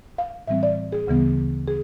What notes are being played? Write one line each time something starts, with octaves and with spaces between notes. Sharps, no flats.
F5
A2 E3 G3 C4 E5
D5
G#4
D2 C#3 E3 G3 B3
G#4